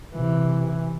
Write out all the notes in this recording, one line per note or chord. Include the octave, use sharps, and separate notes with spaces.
C3 E3